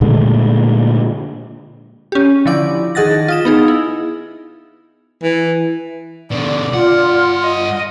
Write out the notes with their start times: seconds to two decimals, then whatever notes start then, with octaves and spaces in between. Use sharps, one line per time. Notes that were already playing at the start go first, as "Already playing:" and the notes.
0.01 A#2 D3 G#3 A3
2.12 C#4 G4
2.46 D3 F3 E4 D6
2.95 D#3 G#4 D#5 F#5 A6 A#6
3.28 F4 D#6 E7
3.45 B3 D#4 G#4
3.68 E4
5.23 E3
6.32 B2 D3 D5
6.73 G2 F4 F#5
7.44 D#5